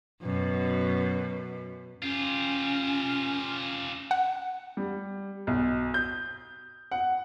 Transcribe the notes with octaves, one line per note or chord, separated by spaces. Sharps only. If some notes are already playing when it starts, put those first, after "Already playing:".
F#2 B2
C#4 F4 G4
F#5
G3
B1
G6
F#5